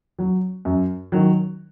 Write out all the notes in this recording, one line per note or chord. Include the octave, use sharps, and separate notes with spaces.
F#3
F#2
D#3 F#3